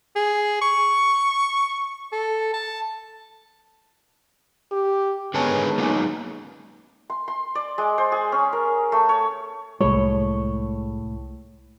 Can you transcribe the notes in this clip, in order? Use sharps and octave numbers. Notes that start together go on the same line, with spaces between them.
G#4
C#6
A4
A5
G4
D3 D#3 G#3 B3 C#4 B4 A5
F#3 A#3 C#4 D#4
C6
C6
D5
G#3
C5
G#4
C#4
A#4
A3
C#5
C2 A2 G#3 C#5